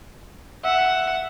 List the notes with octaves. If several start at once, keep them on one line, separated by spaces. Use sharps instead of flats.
E5 F#5